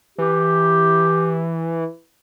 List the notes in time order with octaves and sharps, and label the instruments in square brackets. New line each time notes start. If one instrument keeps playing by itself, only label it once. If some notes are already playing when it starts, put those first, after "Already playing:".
[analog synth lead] E3 [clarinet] G4